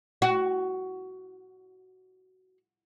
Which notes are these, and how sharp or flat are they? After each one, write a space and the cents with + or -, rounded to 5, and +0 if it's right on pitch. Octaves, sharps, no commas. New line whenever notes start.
F#4 +10